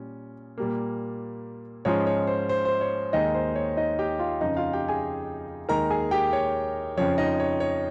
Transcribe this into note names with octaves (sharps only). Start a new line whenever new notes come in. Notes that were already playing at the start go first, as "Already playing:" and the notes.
Already playing: A#2 G3 C#4
A#2 G3 A#3
G#2 F3 G#3 C#4 F4 C#5
C#5
C5
C5
C5
C#5
D#2 D#3 G#3 D#4 D#5
C5
C#5
D#4 D#5
G4 G5
F4 F5
F2 C#3 F3 D#4 D#5
F4 F5
G4 G5
G#4 G#5
D#2 D#3 G#3 D#4 A#4 A#5
G#4 G#5
G4 G5
C#5
F2 C#3 F3 C#5
D#4 D#5
C#5
C#5